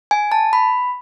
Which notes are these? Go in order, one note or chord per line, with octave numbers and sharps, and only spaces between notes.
G#5
A5
B5